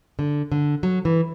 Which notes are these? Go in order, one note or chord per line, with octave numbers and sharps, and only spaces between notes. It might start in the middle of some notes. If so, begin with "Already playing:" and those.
D3
D3
F#3
E3